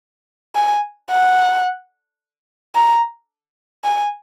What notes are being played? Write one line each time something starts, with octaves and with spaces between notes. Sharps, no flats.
G#5
F#5
A#5
G#5